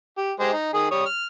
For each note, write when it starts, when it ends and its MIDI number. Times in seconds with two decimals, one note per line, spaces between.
0.18 0.32 67
0.40 0.51 56
0.40 0.51 67
0.40 0.51 72
0.53 0.71 63
0.73 0.86 51
0.73 0.86 68
0.73 0.86 87
0.91 1.04 55
0.91 1.04 73
0.91 1.04 87
1.06 1.25 89